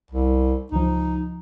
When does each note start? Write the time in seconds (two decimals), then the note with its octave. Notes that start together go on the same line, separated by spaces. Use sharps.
0.11 C2
0.72 C#2 F3 D#4